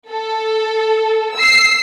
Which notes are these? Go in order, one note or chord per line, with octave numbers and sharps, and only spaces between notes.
A4
E6 C7